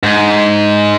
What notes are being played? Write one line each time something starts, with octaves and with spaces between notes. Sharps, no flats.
G#2